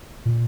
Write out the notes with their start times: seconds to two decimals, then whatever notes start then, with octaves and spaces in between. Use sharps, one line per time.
0.25 A#2